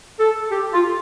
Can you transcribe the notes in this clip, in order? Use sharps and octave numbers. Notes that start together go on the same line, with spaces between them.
A4
G4
F4